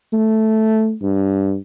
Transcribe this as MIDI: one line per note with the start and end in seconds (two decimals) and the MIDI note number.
0.13 0.95 57
1.02 1.56 43